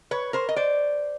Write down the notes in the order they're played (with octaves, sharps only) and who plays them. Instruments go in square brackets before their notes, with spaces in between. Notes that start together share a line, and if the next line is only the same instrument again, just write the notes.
[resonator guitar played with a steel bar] B4 C#5
A#4 C5
D#5
C5 D5